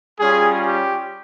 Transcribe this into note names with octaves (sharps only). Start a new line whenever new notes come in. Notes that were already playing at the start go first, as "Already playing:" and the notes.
G3 C#4 F4 G#4
G4